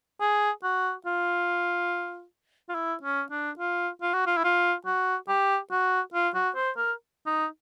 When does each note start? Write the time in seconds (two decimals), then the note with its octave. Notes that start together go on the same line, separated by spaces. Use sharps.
0.21 G#4
0.63 F#4
1.06 F4
2.69 F4
2.75 E4
3.03 C#4
3.31 D4
3.59 F4
4.02 F4
4.14 F#4
4.26 F4
4.37 E4
4.44 F4
4.86 F#4
5.28 G4
5.71 F#4
6.14 F4
6.35 F#4
6.56 C5
6.77 A#4
7.26 D#4